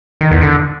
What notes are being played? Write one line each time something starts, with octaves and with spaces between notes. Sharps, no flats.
D#3
E2
D3